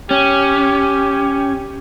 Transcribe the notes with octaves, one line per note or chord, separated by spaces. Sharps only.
C#4 G4